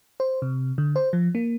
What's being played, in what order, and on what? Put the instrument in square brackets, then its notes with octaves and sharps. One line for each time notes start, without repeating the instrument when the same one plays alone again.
[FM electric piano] C5
C3
D3
C5
F3
A#3